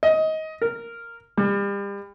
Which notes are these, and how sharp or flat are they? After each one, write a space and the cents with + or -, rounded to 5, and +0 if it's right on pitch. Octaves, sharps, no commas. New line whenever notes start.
D#5 +20
A#4 -5
G3 +35